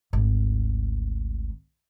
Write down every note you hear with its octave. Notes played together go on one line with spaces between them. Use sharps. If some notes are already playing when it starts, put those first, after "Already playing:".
G#1 D2